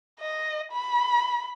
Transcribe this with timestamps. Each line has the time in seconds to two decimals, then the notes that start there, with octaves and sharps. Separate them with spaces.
0.20 D#5
0.72 B5